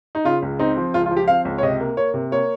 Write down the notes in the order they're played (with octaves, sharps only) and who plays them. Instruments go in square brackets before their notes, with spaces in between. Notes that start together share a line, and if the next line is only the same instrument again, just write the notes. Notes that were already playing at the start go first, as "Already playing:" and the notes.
[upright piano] D#4
C#3 F4
C#2
C4 D#4
F3
C#2 F4
F4
F3
G4
C4 F5
C#2
C#5
C3 D#5
A#3
A#3 C#5
C3
A#3 C#5